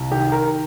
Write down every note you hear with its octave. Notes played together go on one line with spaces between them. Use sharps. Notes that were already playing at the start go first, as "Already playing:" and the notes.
Already playing: C2
D#3 G4
A#4